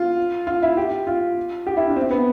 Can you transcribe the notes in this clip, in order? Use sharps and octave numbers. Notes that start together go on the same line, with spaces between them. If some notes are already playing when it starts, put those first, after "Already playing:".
Already playing: F4
F4
E4
G4
F4
G4
E4
D4
C4
B3